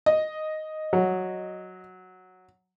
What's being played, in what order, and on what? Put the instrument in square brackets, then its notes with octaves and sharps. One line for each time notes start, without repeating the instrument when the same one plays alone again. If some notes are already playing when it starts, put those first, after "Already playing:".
[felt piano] D#5
[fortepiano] F#3